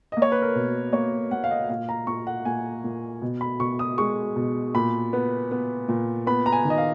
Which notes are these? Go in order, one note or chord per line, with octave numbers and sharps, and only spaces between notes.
A#3 D#5
C#5
B4
A#4
B2
A#3 C#5
A#3 F#5
F5
D#5
A#2 F5
A#5
A#2 C#6
F#5
A#2 G#5
A#2
B2
B5
B2 C#6
D#6
G#3 C#6
B2
A#2 B5
B3
B3
A#2
B3 B5
A#5
G#5
D#3
D#5
F5